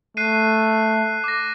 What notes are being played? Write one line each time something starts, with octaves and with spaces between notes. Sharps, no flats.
A3 F#6 C7 D#7
D6 A#6